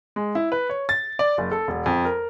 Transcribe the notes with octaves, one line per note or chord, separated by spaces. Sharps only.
G#3
E4
B4
C#5
A6
D5
F#1
A4
E1
F2
A#4